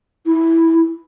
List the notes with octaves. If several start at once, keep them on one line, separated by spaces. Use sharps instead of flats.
E4